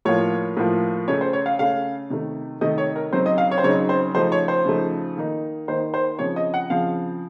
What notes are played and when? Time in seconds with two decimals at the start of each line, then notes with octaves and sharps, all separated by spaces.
0.05 A2 F3 A#3 F4 C#5
0.57 A2 F3 A#3 F4
1.08 C#3 A3 C#4 C#5
1.21 C5
1.33 C#5
1.46 F5
1.59 C#3 A3 C#4 F5
2.10 C3 D#3 A3
2.61 C3 D#3 A3 D#5
2.78 C#5
2.96 A#4
3.12 C#3 F#3 C4 D#4 C5
3.26 D#5
3.38 F5
3.51 C#5
3.58 C5
3.64 C#3 F#3 C4 D#4 C#5
3.89 C5
4.14 C#3 F3 A3 D#4 C5
4.32 C#5
4.48 C5
4.65 C#3 F3 A3 D#4
5.17 D#3 A#3 D#4
5.68 D#3 A#3 D#4 C5
5.94 C5
6.19 C#3 F3 C4 C#5
6.36 D#5
6.54 F#5
6.70 C#3 F3 C4 F5